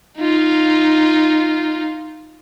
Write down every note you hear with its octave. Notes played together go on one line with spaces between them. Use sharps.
D#4 F4